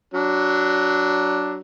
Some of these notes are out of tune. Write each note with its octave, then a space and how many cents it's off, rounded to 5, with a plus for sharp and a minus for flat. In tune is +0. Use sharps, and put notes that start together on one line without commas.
F#3 +15 D4 +0